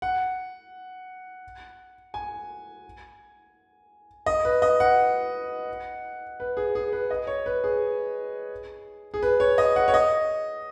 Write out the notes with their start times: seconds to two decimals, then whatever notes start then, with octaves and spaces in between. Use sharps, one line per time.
0.02 F#5
2.14 G#5
4.26 D#5
4.45 B4
4.62 D#5
4.80 F#5
6.40 B4
6.57 G#4
6.75 G#4
6.93 B4
7.11 D#5
7.27 C#5
7.46 B4
7.64 G#4
9.14 G#4
9.23 B4
9.40 C#5
9.58 D#5
9.76 F#5
9.88 C#5
9.94 D#5